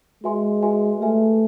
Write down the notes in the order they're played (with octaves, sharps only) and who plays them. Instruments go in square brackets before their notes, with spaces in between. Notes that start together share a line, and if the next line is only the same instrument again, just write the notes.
[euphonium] G#3 [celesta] F#4 B4 E5 G#5 C6
[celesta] F#4 B4 E5 G#5 C6
[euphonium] A3 [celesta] G4 B4 E5 G#5